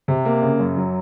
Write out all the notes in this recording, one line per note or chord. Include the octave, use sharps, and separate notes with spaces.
C3
A#3
C#3
F#2
F#3